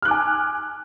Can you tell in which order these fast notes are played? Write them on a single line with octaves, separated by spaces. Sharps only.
F6 F#6 D6 G#5